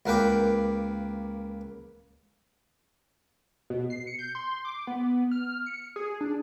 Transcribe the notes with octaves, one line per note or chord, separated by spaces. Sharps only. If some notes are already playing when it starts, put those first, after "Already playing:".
C#2 A#3 A#4 B4 G5 D6
B2
C7
C#7
G6
C6
D6
B3
F6
C#7
G#4
D4